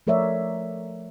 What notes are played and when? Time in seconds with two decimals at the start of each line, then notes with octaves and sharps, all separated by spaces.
0.07 F3 A3 A#4 C#5 D5 E5